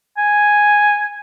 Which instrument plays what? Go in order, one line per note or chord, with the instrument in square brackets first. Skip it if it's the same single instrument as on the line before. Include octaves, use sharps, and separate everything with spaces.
[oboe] G#5